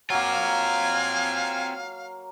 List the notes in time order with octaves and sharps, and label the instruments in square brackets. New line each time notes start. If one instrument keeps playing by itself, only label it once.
[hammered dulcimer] F#3 A#3 [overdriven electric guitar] C4 F4 [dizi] F5 [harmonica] G#5